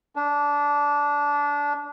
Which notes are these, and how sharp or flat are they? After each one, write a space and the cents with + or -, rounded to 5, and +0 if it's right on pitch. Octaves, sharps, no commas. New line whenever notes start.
D4 -20